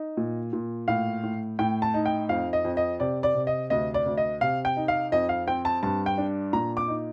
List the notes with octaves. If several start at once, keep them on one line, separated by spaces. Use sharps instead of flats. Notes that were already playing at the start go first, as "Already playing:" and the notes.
Already playing: D#4
A#2
A#2
A2 F5
A2
A2 G5
A5
D#4
G5
F2 F5
D#5
F2
D#5
C3 D5
D5
C3
D#5
D2 D#5
D5
D2
D#5
C3 F5
G5
D#4
F5
F2 D#5
F5
C4 G5
A5
G2 A5
G5
D4
A#2 A#5
D6
D#4